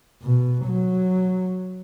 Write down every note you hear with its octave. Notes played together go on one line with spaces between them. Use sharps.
B2
F#3